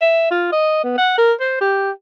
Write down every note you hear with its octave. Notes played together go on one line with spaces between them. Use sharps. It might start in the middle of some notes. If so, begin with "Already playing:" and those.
E5
F4
D#5
B3
F#5
A#4
C5
G4